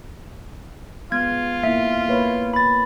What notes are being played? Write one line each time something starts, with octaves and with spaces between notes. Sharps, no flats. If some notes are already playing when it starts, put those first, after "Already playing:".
G#3 B3 F4 G#6
A#3 E4 E5
A#3 B4 C#5
B5 A6